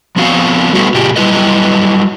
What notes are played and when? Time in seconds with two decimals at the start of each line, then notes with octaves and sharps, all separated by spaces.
0.16 F3 B3 C4 F#4 F5
0.73 G3 A3 B3 D#4 F#4 B4
0.94 A#2 C#3 F4 G4
1.16 F#3 G3 E4 F#4 B4 D#5